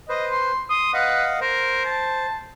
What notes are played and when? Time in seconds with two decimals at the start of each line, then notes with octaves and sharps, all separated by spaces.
0.09 B4 C5 D#5
0.30 C6
0.70 C6 D#6
0.94 B4 D#5 F5 F#5
1.41 A#4 C5
1.85 A5